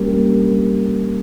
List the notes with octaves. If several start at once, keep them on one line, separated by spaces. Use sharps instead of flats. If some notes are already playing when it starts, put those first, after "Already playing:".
Already playing: G3 A#3 C#4 G4 A#4